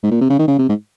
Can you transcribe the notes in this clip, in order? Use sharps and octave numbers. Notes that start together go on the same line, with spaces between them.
G#2
A#2
C3
C#3
D#3
C#3
C3
G#2